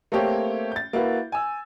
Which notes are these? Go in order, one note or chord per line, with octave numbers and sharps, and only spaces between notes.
A3 A#3 C4 G4 C#5
G6 A6
A#3 E4 F#4 B4
G#5 E6